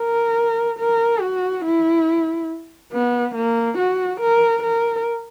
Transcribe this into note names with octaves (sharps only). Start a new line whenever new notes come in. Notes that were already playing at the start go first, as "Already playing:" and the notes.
Already playing: A#4
A#4
F#4
E4
B3
A#3
F#4
A#4
A#4